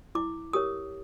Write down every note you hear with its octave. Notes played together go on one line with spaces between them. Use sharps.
E4 D6
G4 A#4 C#5 D#6